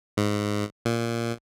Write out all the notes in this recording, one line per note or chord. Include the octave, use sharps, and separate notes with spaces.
G#2
A#2